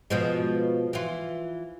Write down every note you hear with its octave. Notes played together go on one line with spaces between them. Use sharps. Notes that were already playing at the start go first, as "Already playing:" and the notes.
B2 F3 G#3
E3 F4